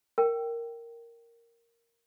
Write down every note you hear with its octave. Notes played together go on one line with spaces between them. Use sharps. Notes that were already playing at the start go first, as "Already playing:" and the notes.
A#4 G5